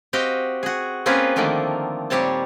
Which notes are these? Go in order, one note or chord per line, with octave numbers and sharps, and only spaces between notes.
C4 F#4 G4 D#5 F5 G5
F#4 G#4
A#3 C4 C#4 F4 G#4 B4
D3 D#3 F3 A3 A#3
A#2 G3 C4 C#5 A5